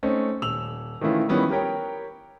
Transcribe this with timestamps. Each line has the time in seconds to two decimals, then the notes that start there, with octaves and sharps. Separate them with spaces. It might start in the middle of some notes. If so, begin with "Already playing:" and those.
0.03 A3 C4 C#4 D#4
0.42 D#1 E6 F7 F#7
1.01 D#3 E3 A3 C#4 E4 F4
1.29 D#3 F3 G3 B3 C#4 E4
1.50 G4 A#4 C#5 G5